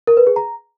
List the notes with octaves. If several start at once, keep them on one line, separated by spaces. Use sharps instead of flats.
A#4
B4
G#4
A#5